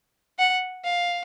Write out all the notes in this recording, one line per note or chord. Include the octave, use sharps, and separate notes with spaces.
F#5
F5